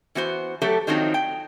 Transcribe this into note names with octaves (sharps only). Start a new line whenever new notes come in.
E3 B3 F#4 C5
F#3 A3 G4 A4
D#3 F3 F#3 C4 D4 D#4
G5